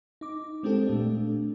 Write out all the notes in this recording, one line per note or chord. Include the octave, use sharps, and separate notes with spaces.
D#4 D6
G#3 C4 D4 G4 A4 C5
A#2 A3 D4